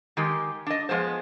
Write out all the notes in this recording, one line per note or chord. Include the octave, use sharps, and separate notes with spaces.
D#3 G#3 G4
D4 D#5
F3 G#3 B3 C5